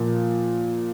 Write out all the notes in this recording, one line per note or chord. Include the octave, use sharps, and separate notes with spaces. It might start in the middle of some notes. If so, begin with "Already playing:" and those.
Already playing: A#2 F3